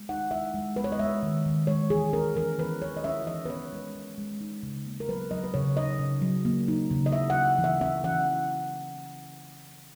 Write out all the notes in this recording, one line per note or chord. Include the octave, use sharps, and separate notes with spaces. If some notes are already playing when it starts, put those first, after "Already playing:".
Already playing: G#3
D#4 F#5
G#3 E5
G#3
G#3 B4
C#5
D#5
G#3 E5
D#3
D#3
G#3 C#5
E3 G#4
C#4 A#4
E3 A#4
E3 B4
E3 C#5
D#5
C#4 E5
E3 D#5
B4
C#4 C#5
G#3
E3
G#3
D#4
C#3
A#3
A#4
F#3 B4
F#3 D#5
B4
C#3 C#5
D#4 D#5
C#3
F#3
A#3
D#4
C#3
D#5
C#4 E5
F#5
C#4
E3
E5
C#4 E5
E3 F#5